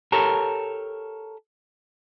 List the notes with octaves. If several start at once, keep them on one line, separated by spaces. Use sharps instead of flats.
G4 A4 A#4 C#5